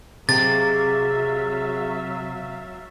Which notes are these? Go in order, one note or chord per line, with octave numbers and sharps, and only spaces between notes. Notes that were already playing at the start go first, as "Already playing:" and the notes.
C3 F#3 G#3 A#3 E5 F5 A6